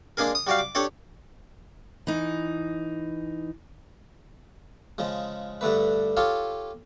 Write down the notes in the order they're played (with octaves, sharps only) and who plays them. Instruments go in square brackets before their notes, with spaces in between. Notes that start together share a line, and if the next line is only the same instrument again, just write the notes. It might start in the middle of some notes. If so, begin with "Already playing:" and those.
[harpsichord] G#3 A#3 D4 G#4 A#4
D#6
G3 F#4 G4 D5 F5
D6
D4 G4 A4 C#5 D5
[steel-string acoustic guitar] E3 D#4
[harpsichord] C#3 F3 G#3
G2 D3 A3 B4
F4 G4 A4 C#5 F5